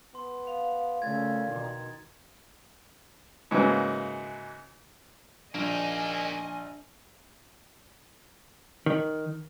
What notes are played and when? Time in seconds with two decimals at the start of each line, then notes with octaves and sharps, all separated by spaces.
0.15 B3 C6
0.47 F5
1.02 A#2 C#3 A3 G#6 A6
1.48 B2 D#3
3.51 G#2 C#3 E3 F#3 A#3
5.55 A#1 A#3 D4 D#4 D#5 G#5
8.86 D#3